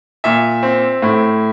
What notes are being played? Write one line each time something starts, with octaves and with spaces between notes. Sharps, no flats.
A#2 E5
C4
A2